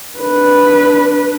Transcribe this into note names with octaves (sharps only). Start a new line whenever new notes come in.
D4 B4